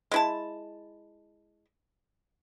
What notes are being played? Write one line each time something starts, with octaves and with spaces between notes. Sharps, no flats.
G#3 E4 A5